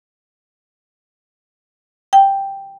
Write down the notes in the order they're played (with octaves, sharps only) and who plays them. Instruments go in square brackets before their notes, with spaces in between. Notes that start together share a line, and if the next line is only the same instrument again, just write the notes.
[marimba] G5